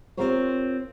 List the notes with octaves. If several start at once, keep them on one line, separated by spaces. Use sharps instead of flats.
C4 F4 G4 A#4 C5 C#5